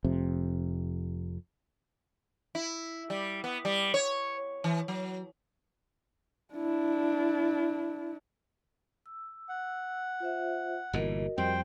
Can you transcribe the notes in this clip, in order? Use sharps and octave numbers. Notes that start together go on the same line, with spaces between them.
F1 F2 C3
E4
G3
B3
G3
C#5
E3
F#3
D4 E4
E6
F#5
F4 C5 E5
G1 A#2 E3 F#4 A#4 D#5
F2 G3 C5 G5